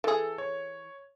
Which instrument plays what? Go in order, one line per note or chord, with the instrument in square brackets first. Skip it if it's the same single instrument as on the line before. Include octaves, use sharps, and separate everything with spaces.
[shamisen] E3 G#4 [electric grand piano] A4
[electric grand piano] C#5